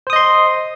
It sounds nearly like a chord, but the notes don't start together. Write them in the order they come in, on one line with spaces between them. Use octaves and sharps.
C5 D#6 D#5 C6